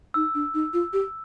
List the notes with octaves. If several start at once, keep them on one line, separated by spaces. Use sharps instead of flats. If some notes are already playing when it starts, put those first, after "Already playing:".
D#4 E6
D4
D#4
F4
G4